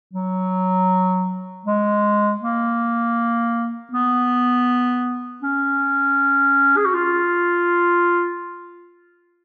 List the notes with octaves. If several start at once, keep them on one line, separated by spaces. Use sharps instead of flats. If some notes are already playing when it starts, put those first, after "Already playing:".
F#3
G#3
A#3
B3
C#4
G#4
F#4
F4